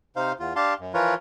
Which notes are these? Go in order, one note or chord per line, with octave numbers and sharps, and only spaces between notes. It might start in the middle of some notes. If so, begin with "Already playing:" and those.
C3 D#4 C5 F5
E2 F4
D4 G4 F5 A5 C6
F#2
E3 F3 F4 A#4 B4 C#5